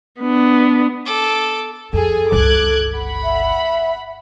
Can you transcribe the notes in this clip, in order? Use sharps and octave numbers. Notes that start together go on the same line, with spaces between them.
B3 D4
A4 D6
F2 G#4 A4 G#5
G1 C#2 D6 F#6 G#6
F#5 B5
E5